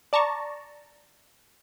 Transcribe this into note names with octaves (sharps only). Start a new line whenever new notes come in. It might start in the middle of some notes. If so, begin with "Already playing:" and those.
D5 A5 A#5 C#6